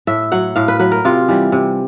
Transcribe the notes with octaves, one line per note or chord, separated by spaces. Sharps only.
A2 E5
F#3 F#5
A2 F5
B4
F#3 B4
A#4
C3 F4
E3 G3
C3